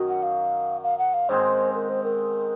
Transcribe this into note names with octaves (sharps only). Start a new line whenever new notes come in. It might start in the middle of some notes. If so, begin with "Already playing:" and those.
Already playing: F#2 D#3 F#3
F#5
F5
F5
F#5
F5
G#2 D#3 G#3 C4 C5
A#4
C5
A#4